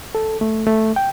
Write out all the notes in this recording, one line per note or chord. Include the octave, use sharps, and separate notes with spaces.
A4
A3
A3
G5